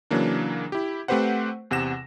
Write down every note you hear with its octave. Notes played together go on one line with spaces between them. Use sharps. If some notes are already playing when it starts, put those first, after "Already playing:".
C#3 E3 F#3 A#3 D4
E4 G4
A3 C4 G4 B4 C5 F#5
E2 C3 F#5 A#6 E7